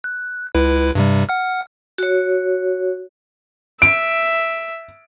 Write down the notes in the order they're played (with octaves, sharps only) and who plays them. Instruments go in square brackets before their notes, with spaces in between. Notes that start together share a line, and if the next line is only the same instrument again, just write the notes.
[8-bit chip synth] F#6
C#2 E4 B4
G2 C3 G3
F#5 F6
[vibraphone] F#4 C#5
[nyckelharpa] E5 [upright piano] D7